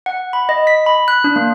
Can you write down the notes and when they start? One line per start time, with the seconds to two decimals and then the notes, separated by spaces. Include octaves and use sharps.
0.06 F#5
0.33 B5
0.49 D#5
0.67 B6
0.86 B5
1.08 F#6
1.24 D4
1.36 A#3